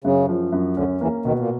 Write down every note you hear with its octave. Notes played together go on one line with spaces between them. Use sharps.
F#2 C#3
F3
F#2
D2 D3 C#4
E2 E3 A#3
D#2 B2 D#3
A#2